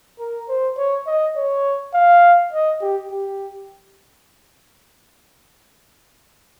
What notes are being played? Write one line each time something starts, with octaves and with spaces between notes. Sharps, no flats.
A#4
C5
C#5
D#5
C#5
F5
D#5
G4
G4